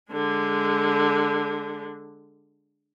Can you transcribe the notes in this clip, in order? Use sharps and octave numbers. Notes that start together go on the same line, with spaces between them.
D3 G#3